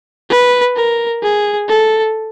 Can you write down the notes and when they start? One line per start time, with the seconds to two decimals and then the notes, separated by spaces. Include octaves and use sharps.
0.30 B4
0.76 A#4
1.23 G#4
1.69 A4